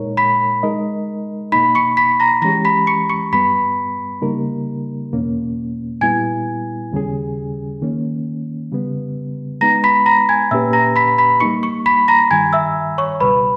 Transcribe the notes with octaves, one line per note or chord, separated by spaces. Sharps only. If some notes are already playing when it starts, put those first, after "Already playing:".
Already playing: A#2 G#3 D#4 A#4 C#5
B5 B6
G#3 D#4 A#4 D#5
B2 A#3 D#4 B5 B6
C#6 C#7
B5 B6
A#5 A#6
E3 G#3 C#4 G4 A#5 A#6
B5 B6
C#6 C#7
C#6 C#7
G2 G3 B3 B5 B6
C#3 G3 A#3 D#4 A#4
E2 B2 A#3 C#4
A#2 G3 B3 E4 G#5 G#6
D#2 C#3 G3 C#4 G#4
D#3 A#3 C#4
C#3 G3 B3
G#3 B3 D#4 A#5 A#6
B5 B6
A#5 A#6
G#5 G#6
A#2 A#3 C#4 G4 B4 E5 E6
A#5 A#6
B5 B6
B5 B6
G3 A#3 D#4 C#6 C#7
C#6 C#7
B5 B6
A#5 A#6
G2 D#3 G3 G#5 G#6
E5 E6
C#5 C#6
C#2 B2 G3 B4 B5